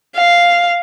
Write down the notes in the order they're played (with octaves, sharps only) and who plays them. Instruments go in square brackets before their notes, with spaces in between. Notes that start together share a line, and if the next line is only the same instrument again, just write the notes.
[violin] F5